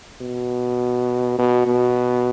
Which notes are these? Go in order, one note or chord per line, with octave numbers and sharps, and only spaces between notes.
B2
B2
B2